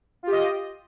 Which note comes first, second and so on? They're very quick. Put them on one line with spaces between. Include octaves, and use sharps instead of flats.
F4 G4 D#5